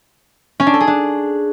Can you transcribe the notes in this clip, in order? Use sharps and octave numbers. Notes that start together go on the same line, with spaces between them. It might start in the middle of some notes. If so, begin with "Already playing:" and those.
C#4
D4
A4
G#4
D4